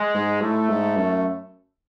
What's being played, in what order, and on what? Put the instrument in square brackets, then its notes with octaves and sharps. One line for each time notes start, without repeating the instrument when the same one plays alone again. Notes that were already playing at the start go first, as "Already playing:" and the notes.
Already playing: [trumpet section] G#3
[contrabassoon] G#2
[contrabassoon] A2 [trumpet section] A3
[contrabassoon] G#2
F#2